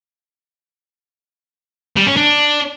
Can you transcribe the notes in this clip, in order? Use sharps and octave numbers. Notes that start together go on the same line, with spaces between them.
G3
C#4
D4